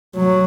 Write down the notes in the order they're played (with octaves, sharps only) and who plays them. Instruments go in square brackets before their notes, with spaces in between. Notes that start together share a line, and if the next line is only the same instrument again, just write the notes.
[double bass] F#3